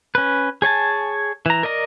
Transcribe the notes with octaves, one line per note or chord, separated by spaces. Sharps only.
C#4 B4
G#4 C#5 G#5 A5
E3 A#5
A#4 D5 D#5 A#5